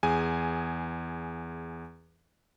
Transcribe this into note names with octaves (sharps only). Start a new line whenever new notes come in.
E2 G#4 G#5